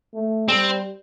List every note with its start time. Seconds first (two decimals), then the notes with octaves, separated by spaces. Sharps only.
0.14 A3
0.48 G3 C4